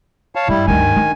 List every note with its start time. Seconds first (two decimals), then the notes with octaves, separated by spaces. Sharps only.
0.35 C#5 F5 A5
0.48 G2 G3 E4
0.67 D2 G2 D#3 G#5
0.96 D3